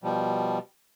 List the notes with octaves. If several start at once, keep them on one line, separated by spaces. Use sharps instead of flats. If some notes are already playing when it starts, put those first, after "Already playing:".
B2 F3 G3